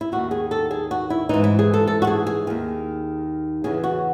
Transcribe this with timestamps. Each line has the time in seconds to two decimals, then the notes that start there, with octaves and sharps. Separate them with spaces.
0.01 E4
0.12 D#2 D#3 F#4
0.31 G#4
0.51 A4
0.71 G#4
0.91 F#4
1.10 E4
1.29 G#2 E3 D#4
1.44 E4
1.59 G#4
1.74 A4
1.87 A4
2.02 F#4
2.07 G#4
2.27 G#4
2.47 D#2 D#3
3.64 E2 C#3 E3 G#4
3.84 F#4